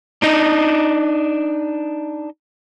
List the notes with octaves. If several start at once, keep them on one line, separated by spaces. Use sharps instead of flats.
D4 D#4 D#5